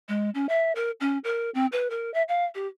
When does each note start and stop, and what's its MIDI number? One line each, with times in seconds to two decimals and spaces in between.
0.09 0.30 56
0.35 0.47 61
0.49 0.72 76
0.75 0.91 70
1.00 1.18 61
1.24 1.50 70
1.55 1.66 60
1.72 1.90 71
1.90 2.13 70
2.14 2.23 76
2.28 2.45 77
2.55 2.67 67